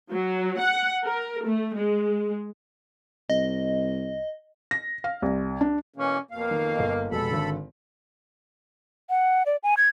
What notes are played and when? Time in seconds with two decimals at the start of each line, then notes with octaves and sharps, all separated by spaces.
0.11 F#3
0.58 F#5
1.04 A#4
1.45 A3
1.75 G#3
3.30 C2 D#5
4.71 A#6
5.04 F5
5.22 C2
5.61 D4
5.96 B2 E3 A#3 C#4
6.31 F2 B2 A#3 F5
6.51 D#3
6.77 G1 D#5
7.11 F1 B2 G#3 A4 B5
7.31 G#1 D3
9.10 F#5
9.46 D5
9.63 G#5
9.77 G#6